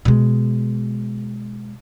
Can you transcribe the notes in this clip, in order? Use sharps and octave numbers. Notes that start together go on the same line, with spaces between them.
B2 G#3